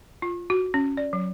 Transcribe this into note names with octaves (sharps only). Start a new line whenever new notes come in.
F4
F#4
C#4
D5
F#3